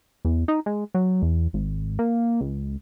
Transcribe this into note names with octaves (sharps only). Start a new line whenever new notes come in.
E2
D#4
G#3
F#3
E2
G#1
A#3
C#2